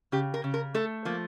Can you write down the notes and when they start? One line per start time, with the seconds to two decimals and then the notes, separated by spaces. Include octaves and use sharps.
0.12 C#3 G4
0.34 A#4
0.44 C#3
0.54 A#4
0.74 A3 A4
1.05 F3 A#3